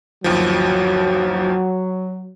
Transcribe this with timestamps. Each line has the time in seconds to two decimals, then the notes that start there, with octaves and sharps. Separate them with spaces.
0.24 G1 D#2 F3 F#3